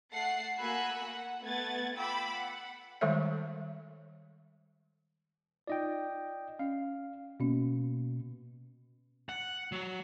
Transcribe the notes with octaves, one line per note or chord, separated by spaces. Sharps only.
A3 F#5 A5 C7
A#3 F#4 G#5 B5 E6 F#6
F#5
A3 B3 B4 F#5 G#6 A6
F4 G5 B5 D6 E6
F#5
D#3 G3 G#3 A4 C#5 E5
D#4 F4 D5 D#5 G5
C#4 F5
B2 A#3 C#4
F#5
F#3